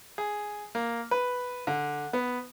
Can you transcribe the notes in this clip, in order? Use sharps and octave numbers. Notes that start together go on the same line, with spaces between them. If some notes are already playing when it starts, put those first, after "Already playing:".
G#4
A#3
B4
D3
B3